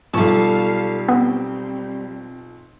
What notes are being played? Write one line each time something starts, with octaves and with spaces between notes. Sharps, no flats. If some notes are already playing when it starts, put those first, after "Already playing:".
B1 F3 G3 A4 F5 A5 C#6
B3 C4